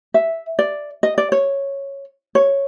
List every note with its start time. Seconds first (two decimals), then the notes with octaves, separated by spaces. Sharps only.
0.14 E5
0.59 D5
1.03 D#5
1.18 D5
1.32 C#5
2.35 C#5